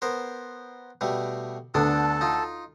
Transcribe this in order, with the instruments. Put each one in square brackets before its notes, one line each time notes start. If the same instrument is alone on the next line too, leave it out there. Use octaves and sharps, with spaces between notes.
[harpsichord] B3 A#4 C5
B2 G3 A3
[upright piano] D2 [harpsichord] D3 B3 D4 [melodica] A4 A5
[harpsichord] D#4 F4